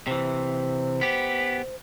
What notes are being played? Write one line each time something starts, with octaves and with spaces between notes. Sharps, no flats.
C3 E3 C5
B3 G4